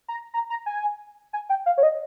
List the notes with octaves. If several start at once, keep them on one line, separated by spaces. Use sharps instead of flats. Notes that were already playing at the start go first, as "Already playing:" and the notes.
A#5
A#5
A#5
G#5
G#5
G5
F5
C#5
D#5